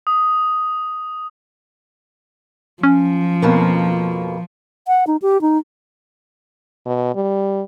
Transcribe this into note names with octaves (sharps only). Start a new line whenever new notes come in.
D#6
F3 C#4
F2 B2 A#3
F#5
D#4
G4
D#4
B2
G3